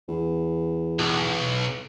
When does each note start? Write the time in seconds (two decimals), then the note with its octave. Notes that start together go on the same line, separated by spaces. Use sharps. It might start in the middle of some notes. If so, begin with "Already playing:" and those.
0.08 E2
0.99 B1